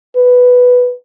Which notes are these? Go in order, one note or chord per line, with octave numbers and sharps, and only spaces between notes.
B4